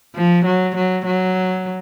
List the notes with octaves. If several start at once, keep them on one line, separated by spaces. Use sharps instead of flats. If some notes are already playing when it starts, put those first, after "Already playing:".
F3
F#3
F#3
F#3